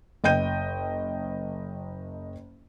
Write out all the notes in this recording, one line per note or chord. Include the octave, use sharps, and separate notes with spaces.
F#1 D#5 G5 G6 D#7